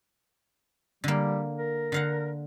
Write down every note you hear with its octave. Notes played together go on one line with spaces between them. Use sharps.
D3 G3 A#3
A#4
D3 F5 F#5